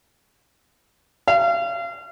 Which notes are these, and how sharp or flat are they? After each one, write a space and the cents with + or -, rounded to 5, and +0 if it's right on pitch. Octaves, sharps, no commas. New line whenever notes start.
F5 -35